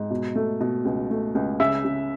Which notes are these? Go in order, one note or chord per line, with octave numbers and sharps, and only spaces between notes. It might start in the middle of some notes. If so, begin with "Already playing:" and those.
Already playing: G#2
B2
A3
B2
C#2
A3
C#2
C#3 E5 E6
C#3